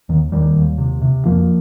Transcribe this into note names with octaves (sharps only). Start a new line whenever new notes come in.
D#2 D#3
D#2 D#3 G3
D#2
C3
C3
F2 F3 A#3